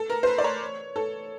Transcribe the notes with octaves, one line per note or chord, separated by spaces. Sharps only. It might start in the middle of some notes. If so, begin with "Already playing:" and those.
Already playing: A4
A#4
C5
B4
D5
C#5
A4